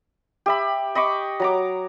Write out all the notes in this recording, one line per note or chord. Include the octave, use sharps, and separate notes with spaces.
G4 E5 B5
D#5 B5 C#6 D6
F#3 A#5 D6